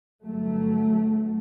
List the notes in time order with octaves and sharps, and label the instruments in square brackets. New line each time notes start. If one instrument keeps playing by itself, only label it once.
[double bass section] G1 G2 F#3 A3